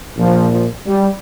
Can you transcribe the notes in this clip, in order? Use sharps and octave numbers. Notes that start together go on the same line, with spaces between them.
A#1 A#2 F3
F3
G3